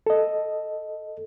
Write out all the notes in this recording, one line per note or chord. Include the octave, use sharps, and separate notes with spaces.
A4 D#5